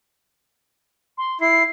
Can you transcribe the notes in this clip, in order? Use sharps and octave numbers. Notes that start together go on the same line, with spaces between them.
C6
E4 C7